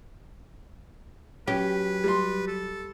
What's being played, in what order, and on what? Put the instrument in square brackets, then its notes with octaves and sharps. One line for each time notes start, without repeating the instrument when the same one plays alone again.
[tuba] F#3 [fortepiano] C#4 [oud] G4 [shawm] B4
[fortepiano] G3 C6
[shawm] A4